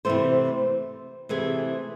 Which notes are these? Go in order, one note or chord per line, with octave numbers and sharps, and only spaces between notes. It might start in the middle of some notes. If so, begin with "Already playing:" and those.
C3 E3 A3 C5
C3 E3 A3 G#4